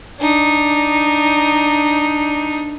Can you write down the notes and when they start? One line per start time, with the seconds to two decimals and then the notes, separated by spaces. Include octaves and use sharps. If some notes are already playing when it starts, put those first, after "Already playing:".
0.20 D4 D#4